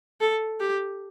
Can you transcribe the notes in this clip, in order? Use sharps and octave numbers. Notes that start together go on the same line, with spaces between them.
A4
G4